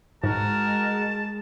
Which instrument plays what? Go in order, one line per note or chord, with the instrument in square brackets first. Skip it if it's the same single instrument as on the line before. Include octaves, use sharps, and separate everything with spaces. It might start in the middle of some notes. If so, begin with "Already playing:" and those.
[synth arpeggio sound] G#2 [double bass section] G#3 [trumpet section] F#4 A#4 [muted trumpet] A5